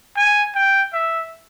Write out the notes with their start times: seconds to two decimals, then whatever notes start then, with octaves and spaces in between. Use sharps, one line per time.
0.17 G#5
0.55 G5
0.93 E5